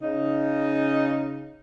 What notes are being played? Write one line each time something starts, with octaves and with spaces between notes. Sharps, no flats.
C#3 D#4